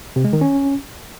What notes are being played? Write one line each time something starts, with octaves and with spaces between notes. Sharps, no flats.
C3
G#3
D#3
C#4